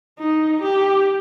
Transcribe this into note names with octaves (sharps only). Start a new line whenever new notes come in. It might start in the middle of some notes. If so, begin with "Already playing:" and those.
D#4
G4